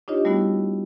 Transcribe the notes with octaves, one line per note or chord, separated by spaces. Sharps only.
D4 D#4 F4 G4 C#5 D#5
G3 A3 B3 E4 F#4